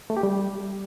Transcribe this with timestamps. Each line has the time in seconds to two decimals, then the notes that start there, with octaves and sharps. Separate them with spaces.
0.10 A3
0.17 G4
0.23 G3